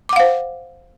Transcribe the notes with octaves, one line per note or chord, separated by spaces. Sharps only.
C5 F5 F#5 D6